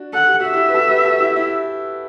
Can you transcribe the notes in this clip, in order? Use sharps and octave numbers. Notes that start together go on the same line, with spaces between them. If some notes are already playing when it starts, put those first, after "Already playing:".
Already playing: D4 F#4
A4 F#5
G4
F#4 E5
E4 G4
B4
F#4 A4
G4 B4
F#4 A4
E4 G4
E4 G4